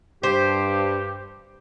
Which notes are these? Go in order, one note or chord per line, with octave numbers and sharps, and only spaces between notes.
G2 G4 C5